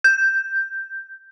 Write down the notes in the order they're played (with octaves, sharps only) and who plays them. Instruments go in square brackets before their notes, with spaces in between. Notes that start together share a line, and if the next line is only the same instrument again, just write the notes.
[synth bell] G6